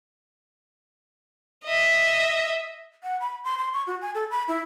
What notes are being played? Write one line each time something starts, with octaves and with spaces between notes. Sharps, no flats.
D#5 E5
F#5
B5
C6
C6
C#6
F#4
G#5
A4
B5
E4